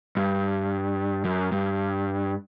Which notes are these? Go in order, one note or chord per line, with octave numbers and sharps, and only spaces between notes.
G2
F#2
G2